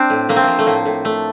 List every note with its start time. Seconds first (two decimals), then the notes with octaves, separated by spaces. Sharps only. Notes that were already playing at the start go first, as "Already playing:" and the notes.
Already playing: C4 D4
0.10 A2
0.29 A3 A#3
0.36 C4
0.43 F3 A#3
0.59 A3
0.66 A2 A#3
0.86 A2
1.05 A3